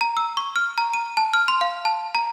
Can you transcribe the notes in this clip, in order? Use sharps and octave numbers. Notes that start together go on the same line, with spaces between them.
A#5
E6
C#6
F6
A#5
D#7
A5
F6
C6
F5
A5
A#5